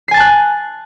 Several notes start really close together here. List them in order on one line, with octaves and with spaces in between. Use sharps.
C7 G#5 A6 A5 F#6